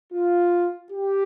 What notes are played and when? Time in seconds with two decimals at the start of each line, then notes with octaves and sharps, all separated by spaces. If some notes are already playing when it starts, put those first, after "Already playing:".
0.12 F4
0.91 G4